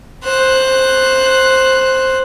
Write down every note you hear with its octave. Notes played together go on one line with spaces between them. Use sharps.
C5 F#6